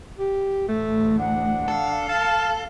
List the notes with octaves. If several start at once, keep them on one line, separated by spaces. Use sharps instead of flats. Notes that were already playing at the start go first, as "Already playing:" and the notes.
G4
A1 D2 A3
D4 F#5
A4 F5
A5 F6